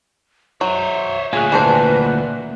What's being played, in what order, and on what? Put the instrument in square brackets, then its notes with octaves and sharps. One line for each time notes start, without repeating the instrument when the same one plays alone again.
[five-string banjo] F#3 [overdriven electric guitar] C5 C#5 [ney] E5
[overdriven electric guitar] D2 A#2 [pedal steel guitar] F4 C#5 F#6 [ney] G#4 [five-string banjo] G#5
[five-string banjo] E3 D4 C5 [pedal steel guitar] A#3 F#5 A#5 [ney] B4